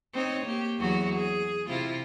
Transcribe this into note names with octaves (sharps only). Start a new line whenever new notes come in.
C4 D#4 C#5
A#3 G4
E2 F#3 F#4
G#4
C3 E4 F4